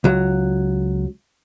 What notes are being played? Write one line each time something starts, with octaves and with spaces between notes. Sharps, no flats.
C#2 F#3